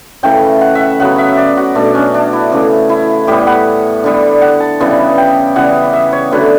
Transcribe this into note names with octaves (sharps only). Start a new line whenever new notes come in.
C#3 E3 A3 G5
F#5
E5 F#5
C#3 F#3 B3 F#5
E5
D5
F#4
B2 A3 D4
C#4
D4
E4
C#3 E3 A3
E4
A2 G3 B3 G4
F#5
D3 G3 B3
F#5
A5
C#3 E3 G3 B3
G5
C#3 E3 G3 B3 F#5
E5
C#5
D3 F#3 A3 B4